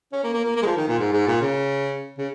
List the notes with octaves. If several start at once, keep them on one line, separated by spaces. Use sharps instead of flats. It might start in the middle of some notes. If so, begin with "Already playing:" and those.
C#4
A#3
A#3
A#3
A#3
G#3
F3
D#3
A#2
G#2
G#2
A#2
C#3
C#3